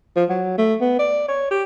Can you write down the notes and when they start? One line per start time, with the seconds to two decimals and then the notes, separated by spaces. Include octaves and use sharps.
0.16 F3
0.29 F#3
0.58 A3
0.80 B3
0.99 D5
1.28 C#5
1.51 G4